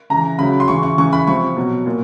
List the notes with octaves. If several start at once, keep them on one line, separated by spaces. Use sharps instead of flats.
C#3 E3 A#5
C#3 F#3 B5
C6
C#3 E3 C#6
C#6
C#3 E3 C#6
B5
C3 F3 C#6
B2 F#3
A#2